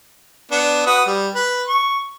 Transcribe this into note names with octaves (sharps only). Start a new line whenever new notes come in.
B3 D4
F#4 B4 D#6
G3
B4
C#6